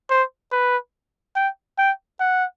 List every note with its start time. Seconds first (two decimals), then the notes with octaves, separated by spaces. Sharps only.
0.10 C5
0.52 B4
1.36 G5
1.78 G5
2.20 F#5